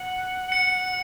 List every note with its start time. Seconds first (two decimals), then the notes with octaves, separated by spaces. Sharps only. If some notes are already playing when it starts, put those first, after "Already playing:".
Already playing: F#5
0.52 C#7